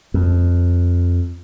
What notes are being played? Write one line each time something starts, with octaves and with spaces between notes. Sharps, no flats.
F2